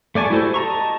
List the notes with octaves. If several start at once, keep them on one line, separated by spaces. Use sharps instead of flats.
A3 D5 G#5 A5 C#6
E4 F#4 G4 A4 C5
D#5 A5 A#5 C#6